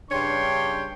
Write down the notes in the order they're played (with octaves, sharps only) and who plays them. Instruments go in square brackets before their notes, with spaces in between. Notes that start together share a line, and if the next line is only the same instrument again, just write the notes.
[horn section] G2 C#3 D4 C#5 G5 C6